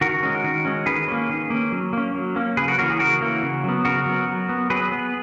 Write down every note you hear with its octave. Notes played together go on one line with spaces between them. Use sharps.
D#3 F#4 A#4
G#3 C#4
D#3
G#3 C#4
D#3 G#4 B4
A#3 C#4
D#3
A#3 C#4
F#3
A#3 C#4
F#3
A#3 C#4
C#3 G#4 B4
F#4 A#4
E3 A#3 C#4 F#4 A#4
G#4
C#3 F#4 A#4
E3 A#3 C#4
C#3
F#3 B3
C#3 F#4 A#4
F#3 B3
F#3
B3
F#3 G#4 B4
B3